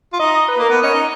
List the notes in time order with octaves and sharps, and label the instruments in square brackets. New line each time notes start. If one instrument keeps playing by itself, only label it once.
[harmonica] F4
[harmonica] D#4 [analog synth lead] D#5
[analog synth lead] D#5
B4
[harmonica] A#3 [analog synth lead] A#4
[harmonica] B3
[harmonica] C#4 [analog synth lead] D#5
[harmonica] D#4